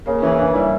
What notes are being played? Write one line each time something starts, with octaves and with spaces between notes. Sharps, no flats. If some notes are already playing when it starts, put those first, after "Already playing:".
C#3 A#3
E3 C#4
C#3 D4
G3 E4